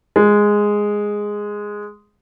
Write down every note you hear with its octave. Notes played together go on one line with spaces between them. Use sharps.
G#3